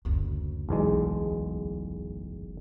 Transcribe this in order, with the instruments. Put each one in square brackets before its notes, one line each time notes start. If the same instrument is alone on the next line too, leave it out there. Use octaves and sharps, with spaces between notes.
[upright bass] F#1 D2
[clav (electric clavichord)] B1 E2 G#3